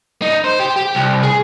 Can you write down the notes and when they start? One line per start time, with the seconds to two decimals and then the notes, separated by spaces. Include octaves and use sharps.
0.22 D#4
0.44 C5
0.59 G4
0.76 G4
0.95 C2
1.23 G#4